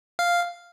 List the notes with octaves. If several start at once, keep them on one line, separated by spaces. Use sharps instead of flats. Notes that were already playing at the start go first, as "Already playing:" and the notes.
F5